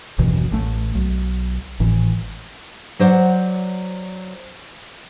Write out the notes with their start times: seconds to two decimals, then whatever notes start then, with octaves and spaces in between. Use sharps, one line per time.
0.18 F#1 D#2 B2 E3
0.52 A1 A3
0.95 B1
1.80 G#1 A2 E3
2.99 F#3 C5 D5 F#5